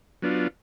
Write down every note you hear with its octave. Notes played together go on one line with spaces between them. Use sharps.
F#3 B3 D4 F4